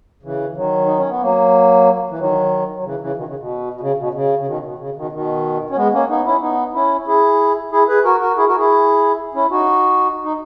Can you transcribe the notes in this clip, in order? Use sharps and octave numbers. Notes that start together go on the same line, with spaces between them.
C#3 E3
D#3 F#3
D#4
C#4
B3
F#3 A#3
E3
D#3 F#3
F#3
C#3 E3
C#3 E3
B2 D#3
C#3
B2
B2
C#3
B2
C#3
C#3
B2 D#3
B2
C#3
B2 D#3
B2 D#3
C#4
G#3 B3
A#3 C#4
B3 D#4
C#4 E4
B3 D#4
C#4 E4
E4 G#4
E4 G#4
G#4 B4
F#4 A#4
F#4 A#4
E4 G#4
F#4 A#4
E4 G#4
C#4 E4
D#4 F#4
D#4